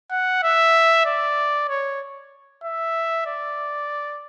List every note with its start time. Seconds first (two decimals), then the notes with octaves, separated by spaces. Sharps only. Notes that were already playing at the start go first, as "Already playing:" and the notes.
0.11 F#5
0.43 E5
1.06 D5
1.69 C#5
2.64 E5
3.27 D5